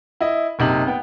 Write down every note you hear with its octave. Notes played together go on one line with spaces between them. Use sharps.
E4 D#5
F#1 C3 D#4 F#7
B3 G5